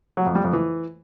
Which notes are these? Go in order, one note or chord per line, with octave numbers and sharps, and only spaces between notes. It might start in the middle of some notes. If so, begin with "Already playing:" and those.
F#3
F2
G3
F2
E3